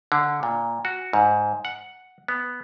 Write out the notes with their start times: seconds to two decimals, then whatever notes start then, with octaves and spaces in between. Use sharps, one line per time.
0.12 D3
0.43 A#2
0.85 F#4
1.13 G#2
1.65 F#5
2.28 B3